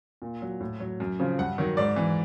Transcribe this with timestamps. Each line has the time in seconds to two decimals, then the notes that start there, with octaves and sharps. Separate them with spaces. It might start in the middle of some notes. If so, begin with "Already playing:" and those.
0.22 A#2
0.42 F#3
0.60 A2
0.80 F#3
1.00 F#2
1.19 C#3 F3
1.38 G2 F#5
1.58 D#3 F#3
1.77 G#2 D5
1.96 E3